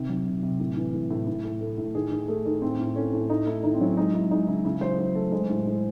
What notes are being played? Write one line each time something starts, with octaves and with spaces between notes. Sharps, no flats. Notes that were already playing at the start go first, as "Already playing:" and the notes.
Already playing: C3 D#3
F#3
C3
C3
A2
E3
A2
A2
A2
A2
A3
A2
D#3 G#4
D#3
A3 G#4
D#3
A2 C4
A2
A3 C#4
A2
A3 D#4
A3 E4
D#3 D#4
C4
F#3 C#4
G#3 D#4
G#3 E4
G#3 D#4
C#3 E4
C#3 E4
F#3 C5
F#3 C5
A3 A4
G#3 C5
A2
G#3